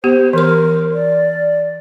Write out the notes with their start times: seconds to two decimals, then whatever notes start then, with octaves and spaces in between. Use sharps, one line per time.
0.04 B3 G4 C5
0.33 E3 A#4 C6
0.93 D5